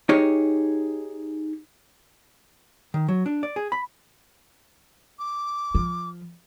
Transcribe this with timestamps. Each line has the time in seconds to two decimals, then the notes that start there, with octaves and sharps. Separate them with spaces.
0.09 D#4 G4 G#4 C#5
2.94 D#3
3.08 F#3
3.26 D4
3.43 D5
3.56 G#4
3.72 B5
5.19 D6
5.75 F3